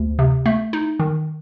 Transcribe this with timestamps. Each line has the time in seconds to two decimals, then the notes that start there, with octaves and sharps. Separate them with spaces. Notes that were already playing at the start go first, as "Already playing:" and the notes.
Already playing: D2
0.19 C3
0.46 A3
0.73 D#4
1.00 D#3